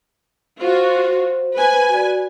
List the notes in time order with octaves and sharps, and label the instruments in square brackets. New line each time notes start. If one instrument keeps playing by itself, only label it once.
[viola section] F4 F#4 [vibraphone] C5
[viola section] B4 G#5
[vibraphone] F#4 D5